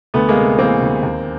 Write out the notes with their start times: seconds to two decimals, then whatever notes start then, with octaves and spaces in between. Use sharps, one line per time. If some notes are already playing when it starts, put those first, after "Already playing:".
0.14 D2 A3 B3
0.29 G#3 A#3
0.37 C3
0.59 E3 A#3 C4
0.82 D2
1.03 D#2